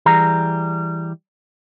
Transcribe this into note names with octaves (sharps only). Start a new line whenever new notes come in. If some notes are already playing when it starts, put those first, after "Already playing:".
E3 G3 G#4 A#5